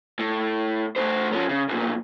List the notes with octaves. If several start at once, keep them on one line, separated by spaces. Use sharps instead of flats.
A2
A3 C5
F3 C#4
C#3
B1 A#2